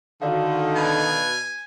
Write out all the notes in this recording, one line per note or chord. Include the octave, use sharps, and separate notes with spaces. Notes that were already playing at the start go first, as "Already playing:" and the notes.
D3 D#3 F#4 D5 F5
B2 G#5